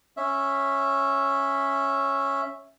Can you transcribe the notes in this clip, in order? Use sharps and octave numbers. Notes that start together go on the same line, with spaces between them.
C#4 E5